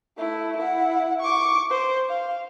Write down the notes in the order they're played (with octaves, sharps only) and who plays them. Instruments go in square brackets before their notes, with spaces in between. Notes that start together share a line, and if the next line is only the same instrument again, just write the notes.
[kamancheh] A3 E4
E4 F#5
C#6 D6
C5
F5